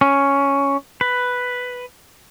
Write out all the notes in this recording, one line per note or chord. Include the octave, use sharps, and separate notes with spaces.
C#4
B4